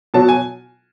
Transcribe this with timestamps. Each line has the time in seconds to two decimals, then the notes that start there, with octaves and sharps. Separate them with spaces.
0.14 B2 F#3 A5
0.29 G#5